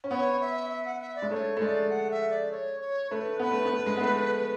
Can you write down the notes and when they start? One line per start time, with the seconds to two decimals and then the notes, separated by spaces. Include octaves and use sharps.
0.04 C#4
0.10 B3 C#5
0.41 E5
0.70 E5
0.85 F#5
1.01 E5
1.16 D5
1.22 G#3
1.31 A3 C#5
1.57 A3
1.61 G#3 D5
1.90 F#5
2.11 E5
2.30 D5
2.51 C#5
2.81 C#5
3.11 A3 B4
3.39 B3 B4
3.51 A3
3.65 B3
3.71 A3
3.86 G#3
3.97 B3
4.01 A3